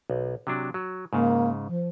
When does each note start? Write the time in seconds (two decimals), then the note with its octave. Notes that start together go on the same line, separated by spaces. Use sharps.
0.10 B1
0.47 C3 F#3 D4
0.74 F#3
1.13 G#2 C#3 A#3
1.67 F3